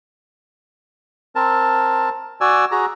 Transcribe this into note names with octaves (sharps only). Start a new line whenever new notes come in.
C4 A#4 A5
F#4 D5 G#5 E6
F#4 G#4 A#5